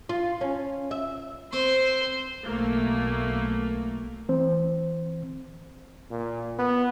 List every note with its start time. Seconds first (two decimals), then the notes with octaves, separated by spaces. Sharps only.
0.09 F4
0.41 C#4
0.91 E5
1.53 C4 C5
2.43 B1 A3 A#3
4.29 E3 C4 C5
6.11 A#2
6.59 B3